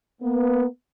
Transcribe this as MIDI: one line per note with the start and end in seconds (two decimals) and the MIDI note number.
0.22 0.65 58
0.22 0.65 59